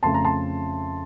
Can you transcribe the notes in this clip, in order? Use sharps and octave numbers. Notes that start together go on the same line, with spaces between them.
F2 C#3 A3 A5 C6
A#5
A5 C6